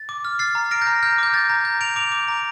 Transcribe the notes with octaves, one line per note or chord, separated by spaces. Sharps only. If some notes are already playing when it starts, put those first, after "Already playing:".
Already playing: A6
D6
F6
F6 A6 C7
A#5
F6 A#6 D7
G6 A#6
A#5
F6 G6
D6 G6
G6 A6
A#5
G6
G6 D7 F7
D6 D7 F7
D6
A#5